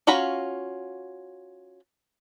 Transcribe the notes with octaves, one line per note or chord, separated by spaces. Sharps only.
C#4 F4 F#4 A#5 B5